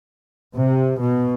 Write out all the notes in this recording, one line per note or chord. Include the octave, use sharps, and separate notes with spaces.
C3
B2